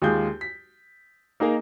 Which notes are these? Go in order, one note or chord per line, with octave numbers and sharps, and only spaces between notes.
D#2 G#3 F4 G#4 G6
B6
A#3 D#4 G#4 A#4